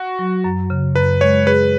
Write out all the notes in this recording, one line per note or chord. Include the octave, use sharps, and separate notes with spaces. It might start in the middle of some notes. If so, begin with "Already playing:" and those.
Already playing: F#4
F#3
F#2
C#3
F#2 B4
G#3 C#5
G#4 B4